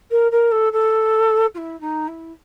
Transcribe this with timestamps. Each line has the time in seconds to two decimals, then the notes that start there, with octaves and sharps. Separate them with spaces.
0.11 A#4
0.31 A#4
0.51 A4
0.72 A4
1.54 F4
1.57 E4
1.80 D#4
2.08 E4